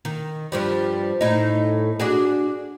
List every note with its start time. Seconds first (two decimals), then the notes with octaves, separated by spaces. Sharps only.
0.05 D#3
0.52 G2 F3 G3
1.21 A2 D#4
2.00 D4 F#4 G#4